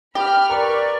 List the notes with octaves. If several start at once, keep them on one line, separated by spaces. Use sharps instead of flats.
G4 B5 F6
A#4 B4 D5 C#6